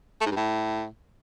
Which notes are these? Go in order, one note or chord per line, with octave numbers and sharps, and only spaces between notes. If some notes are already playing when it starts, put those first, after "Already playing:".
A3
G#2
G2
A2